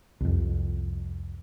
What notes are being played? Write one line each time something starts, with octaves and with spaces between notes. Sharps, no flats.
C2 F2